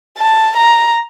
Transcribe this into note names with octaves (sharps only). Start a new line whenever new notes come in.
A5
A#5